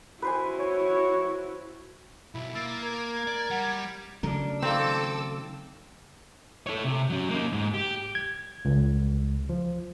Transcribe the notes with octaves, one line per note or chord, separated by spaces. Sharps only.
E4 F#4 B4 C5 G#5
C#5
B1 E4
A#3 E6 A6
A#4 G#6
D5
G3 F#5 A6
C#3 F#3 A3 D4 A#4
D#3 C4 A4 F5 D6 E6
A4 C#5
C3
F#3 C#4
A#3 D#4
G#2
G4
G#6
C#2
F3